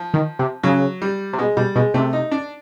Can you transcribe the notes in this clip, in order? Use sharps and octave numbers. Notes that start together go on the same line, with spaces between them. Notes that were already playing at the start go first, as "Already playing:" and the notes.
Already playing: F3
D#3
C3
C#3 F#3
G3
C3
B2 G#3
B2 G3
B2 G#3
C3 A3
D#4
D4